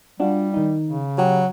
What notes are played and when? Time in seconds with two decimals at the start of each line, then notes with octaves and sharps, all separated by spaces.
0.20 G3 D4 F4 F#4
0.54 D#3 D#4
0.86 C#3
1.18 F#3 G4